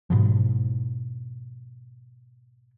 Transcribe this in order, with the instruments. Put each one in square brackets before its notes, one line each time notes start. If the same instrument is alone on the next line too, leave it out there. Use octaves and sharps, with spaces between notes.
[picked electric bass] G#2 B2 F3